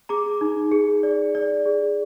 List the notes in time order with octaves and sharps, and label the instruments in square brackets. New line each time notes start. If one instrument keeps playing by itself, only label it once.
[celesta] G#4 A#5 D6
D#4
G#4
D5
D5
G#4